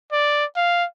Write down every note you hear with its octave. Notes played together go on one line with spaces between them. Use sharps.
D5
F5